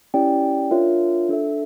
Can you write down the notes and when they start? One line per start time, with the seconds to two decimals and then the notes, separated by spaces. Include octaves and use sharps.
0.14 C#4 E4 G4 D5 G5
0.71 D4 F4 A#4 C#5 E5
1.29 D4 A4 E5